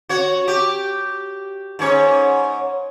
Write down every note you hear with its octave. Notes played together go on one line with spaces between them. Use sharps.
F#4 C#5
G4
G#2 C#4 C#5